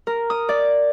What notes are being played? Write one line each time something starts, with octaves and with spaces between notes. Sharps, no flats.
A#4
D#6
D5